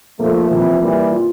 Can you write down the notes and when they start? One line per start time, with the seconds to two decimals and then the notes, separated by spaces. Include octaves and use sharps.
0.20 F3 A3 A#3
0.50 C3 E3 F3
0.81 E3 G3 A#3
1.12 F4